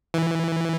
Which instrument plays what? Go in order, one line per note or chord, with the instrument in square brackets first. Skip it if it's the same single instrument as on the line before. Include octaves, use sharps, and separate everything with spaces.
[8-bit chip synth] E3